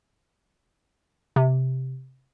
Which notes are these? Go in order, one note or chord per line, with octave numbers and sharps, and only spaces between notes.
C3